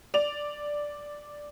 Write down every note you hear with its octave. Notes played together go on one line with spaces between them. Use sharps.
D5 F7